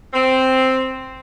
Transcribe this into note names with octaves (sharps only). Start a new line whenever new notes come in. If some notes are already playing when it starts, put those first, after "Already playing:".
C4